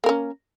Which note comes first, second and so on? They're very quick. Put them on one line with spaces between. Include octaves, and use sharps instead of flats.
A#3 A#4 C#4